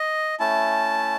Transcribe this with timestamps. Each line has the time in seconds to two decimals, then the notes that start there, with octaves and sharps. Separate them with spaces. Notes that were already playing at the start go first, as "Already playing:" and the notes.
Already playing: D#5
0.39 A3 C#4 E4 A5